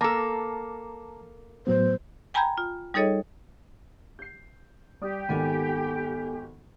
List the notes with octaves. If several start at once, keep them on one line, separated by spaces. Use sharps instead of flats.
A#3 A4 A5 A#5 D6
A2 F#3 B3 C5
G5 G#5 A#5 B5 G6 G#6
F4
G3 D#4 G#4 A4 C#5 D#5
G6 C7
G3 G4 D5 D#6
G#1 D#3 B3 A4 F#5 G#5